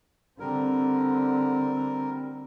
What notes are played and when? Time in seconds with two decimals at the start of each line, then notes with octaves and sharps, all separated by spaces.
0.40 D3 G3 C4 A#4